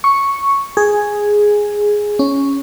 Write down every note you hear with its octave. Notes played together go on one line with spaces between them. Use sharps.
C#6
G#4
C#4